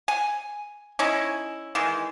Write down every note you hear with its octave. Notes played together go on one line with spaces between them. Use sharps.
G#5
C#4 D#4 E4
D#3 E3 G#3